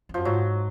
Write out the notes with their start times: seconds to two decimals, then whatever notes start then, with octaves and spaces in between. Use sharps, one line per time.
0.09 F2
0.14 F#2 F3
0.25 G#2 F#3